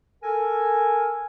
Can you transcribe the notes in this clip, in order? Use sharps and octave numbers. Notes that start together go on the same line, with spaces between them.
A4 A#4 G#5